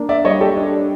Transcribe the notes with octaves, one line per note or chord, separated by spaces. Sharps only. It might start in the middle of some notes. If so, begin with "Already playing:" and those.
Already playing: A#3 D4
D5 E5
G3 C#5 D#5
G4 A4
D4